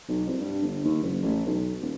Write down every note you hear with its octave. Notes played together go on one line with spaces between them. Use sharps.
B1
C2
G2
G1
D#2
F#1
A1
B1
D#1